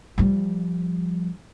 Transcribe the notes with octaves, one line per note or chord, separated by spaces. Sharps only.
F3 G3